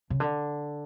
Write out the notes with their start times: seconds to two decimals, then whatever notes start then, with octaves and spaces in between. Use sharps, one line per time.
0.10 C#3
0.20 D3